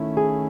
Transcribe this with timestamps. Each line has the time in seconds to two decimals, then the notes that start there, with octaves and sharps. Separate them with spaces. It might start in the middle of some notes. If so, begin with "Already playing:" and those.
Already playing: D#3 A3 C#4 E4
0.17 G#4